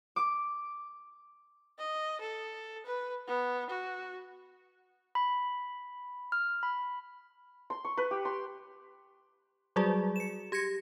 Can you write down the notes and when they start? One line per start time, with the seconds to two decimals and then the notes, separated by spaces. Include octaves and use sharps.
0.16 D6
1.79 D#5
2.21 A4
2.86 B4
3.28 B3
3.71 F#4
5.15 B5
6.32 F6
6.63 B5
7.70 C6
7.85 C#6
7.97 B4
8.11 G4
8.25 C6
9.76 F#3 G3 F#4 G#4 D5
10.16 C#7 E7
10.52 G4 G#6 A#6 C#7